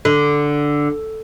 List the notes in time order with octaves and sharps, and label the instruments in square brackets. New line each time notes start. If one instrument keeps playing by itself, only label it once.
[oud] D3